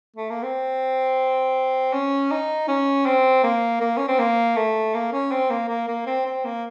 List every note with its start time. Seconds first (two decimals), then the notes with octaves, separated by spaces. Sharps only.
0.16 A3
0.30 A#3
0.43 C4
1.93 C#4
2.31 D#4
2.68 C#4
3.06 C4
3.44 A#3
3.81 A#3
3.97 C#4
4.08 C4
4.19 A#3
4.56 A3
4.94 A#3
5.13 C#4
5.31 C4
5.50 A#3
5.69 A#3
5.88 A#3
6.07 C4
6.26 C4
6.45 A#3